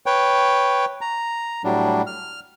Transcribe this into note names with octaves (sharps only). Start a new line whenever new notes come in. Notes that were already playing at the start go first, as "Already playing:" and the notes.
B4 C#5 G5
A#5
A2 F#3 G3 D4
F6